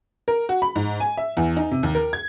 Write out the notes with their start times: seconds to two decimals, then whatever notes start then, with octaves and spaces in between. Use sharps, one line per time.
0.28 A#4
0.49 F#4
0.62 B5
0.75 G#2
1.00 G#5
1.17 E5
1.37 E2
1.57 D#4
1.71 C3
1.83 D#2
1.95 A#4
2.13 G#6